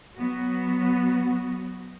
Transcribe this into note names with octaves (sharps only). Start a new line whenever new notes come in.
F#3 B3 F#4